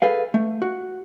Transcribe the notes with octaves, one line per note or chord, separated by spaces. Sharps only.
G#4 A4 B4 F5
A3
F#4